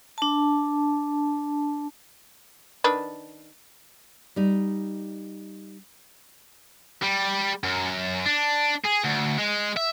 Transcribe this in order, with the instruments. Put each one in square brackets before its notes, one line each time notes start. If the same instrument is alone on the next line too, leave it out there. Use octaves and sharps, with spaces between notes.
[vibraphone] D4 A5
[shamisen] D#3 D4 B4
[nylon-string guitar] G3 D#4
[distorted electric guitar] G3
F#2
D4
G#4
D2
G#3
E5